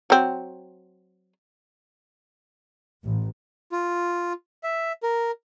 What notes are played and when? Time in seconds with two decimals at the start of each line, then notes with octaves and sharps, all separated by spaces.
0.10 F#3 C4
3.04 A1
3.72 F4
4.63 E5
5.03 A#4